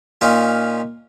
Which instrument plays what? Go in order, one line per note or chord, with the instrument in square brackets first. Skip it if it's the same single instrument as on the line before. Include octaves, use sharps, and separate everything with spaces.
[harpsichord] A#2 C#4 D#4 F4 A#4